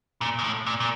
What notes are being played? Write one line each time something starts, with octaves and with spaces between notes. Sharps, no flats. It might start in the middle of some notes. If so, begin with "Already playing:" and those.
A#2
G#2
A2
A#2
A#2